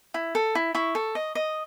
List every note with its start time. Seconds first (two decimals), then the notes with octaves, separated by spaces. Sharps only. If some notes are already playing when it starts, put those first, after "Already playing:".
0.14 E4
0.35 A4
0.55 E4
0.75 E4 C#6
0.95 A4
1.15 D#5
1.35 D#5